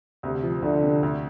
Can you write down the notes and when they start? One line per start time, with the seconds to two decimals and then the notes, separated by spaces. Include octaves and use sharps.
0.23 D2 C3
0.43 F3
0.62 D2 D3
0.83 C3
1.03 D2